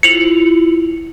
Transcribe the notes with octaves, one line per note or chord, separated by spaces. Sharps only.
E4 F4 C#7 F7 F#7